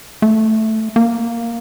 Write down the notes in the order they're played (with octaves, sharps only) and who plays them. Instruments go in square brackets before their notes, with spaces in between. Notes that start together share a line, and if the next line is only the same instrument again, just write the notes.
[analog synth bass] A3
A#3